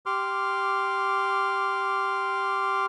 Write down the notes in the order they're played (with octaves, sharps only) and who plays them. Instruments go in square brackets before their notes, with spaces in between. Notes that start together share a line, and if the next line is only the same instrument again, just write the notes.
[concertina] G4 C6 D6 F6